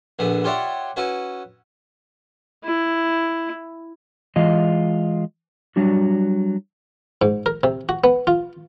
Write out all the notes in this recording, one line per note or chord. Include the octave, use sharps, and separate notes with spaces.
A#1 D3 B3 B5
F4 G4 C#5 D5 E5 F#5
C#4 E4 F#4 B4
E4
E3 G#3 F4 D#5
F#3 G3 D4 F#4
G#2
A#4
C3
F#4
B3
F4